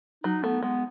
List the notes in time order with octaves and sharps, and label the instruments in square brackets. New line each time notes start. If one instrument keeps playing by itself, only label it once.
[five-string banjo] F#3 [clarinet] D#4
[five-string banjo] A3 [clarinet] B3
[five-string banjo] G#3 [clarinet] B3